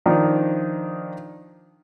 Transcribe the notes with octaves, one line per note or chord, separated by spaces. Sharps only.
D#3 F3 D4 D#4